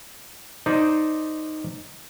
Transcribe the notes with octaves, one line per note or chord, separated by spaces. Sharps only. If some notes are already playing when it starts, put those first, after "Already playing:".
D#4 C5 D5